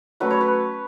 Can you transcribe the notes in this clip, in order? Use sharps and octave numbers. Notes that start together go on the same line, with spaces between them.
F#3 A3 C#4 B4
C#5
B4